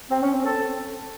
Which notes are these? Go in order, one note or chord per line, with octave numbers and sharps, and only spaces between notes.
C4
C#4
C4
A4